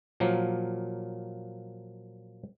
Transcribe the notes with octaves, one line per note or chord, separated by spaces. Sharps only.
A#2 F3 F#3 A#3